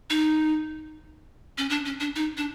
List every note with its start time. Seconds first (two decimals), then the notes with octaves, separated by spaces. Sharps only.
0.10 D#4
1.58 C#4
1.69 D4
1.85 C#4
2.00 D4
2.16 D#4
2.37 D4